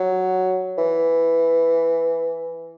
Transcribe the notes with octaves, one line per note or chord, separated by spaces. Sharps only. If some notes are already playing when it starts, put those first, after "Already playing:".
Already playing: F#3
E3